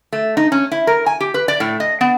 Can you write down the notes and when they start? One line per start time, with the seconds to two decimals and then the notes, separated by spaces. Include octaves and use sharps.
0.13 A3
0.37 D#4
0.52 C#4
0.72 E4
0.87 A#4
1.06 G#5
1.21 G4
1.34 B4
1.48 D5
1.60 A2
1.80 D#5
2.01 B3